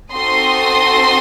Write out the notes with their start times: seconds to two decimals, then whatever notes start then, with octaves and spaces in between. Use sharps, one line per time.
0.12 C4 D#4 F#4 A4 C6 D#6